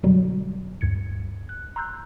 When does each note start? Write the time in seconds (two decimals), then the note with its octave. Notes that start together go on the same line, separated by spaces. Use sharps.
0.03 F#2 B2 D3 F#3 G3
0.81 D2 G2 G#6 C#7
1.49 F#6
1.76 A#5 C6 E6 F#6 G6